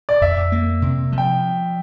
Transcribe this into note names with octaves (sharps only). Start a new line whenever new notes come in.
D5
F2 E5
A#3
C3
F3
G5